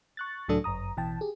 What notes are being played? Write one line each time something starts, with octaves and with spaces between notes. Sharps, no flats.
C#6 F#6 A6
C#2 A2 F#3 D4 A4 D#6
G1 F#2 A#5 D#6
A1 B2 E3 G5 A5
G4 G#4